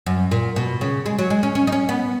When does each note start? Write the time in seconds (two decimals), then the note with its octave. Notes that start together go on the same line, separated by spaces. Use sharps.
0.06 F#2
0.31 A#2
0.56 B2
0.81 C#3
1.06 G#3
1.19 F#3
1.30 G#3
1.43 C#4
1.55 C#4
1.67 D#4
1.72 C#4
1.89 B3